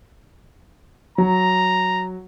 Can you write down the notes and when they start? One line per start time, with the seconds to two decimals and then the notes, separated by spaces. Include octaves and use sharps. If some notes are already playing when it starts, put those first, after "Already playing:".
1.18 F#3 A#5